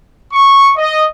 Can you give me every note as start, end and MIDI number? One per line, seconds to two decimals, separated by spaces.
0.33 0.71 85
0.77 1.05 75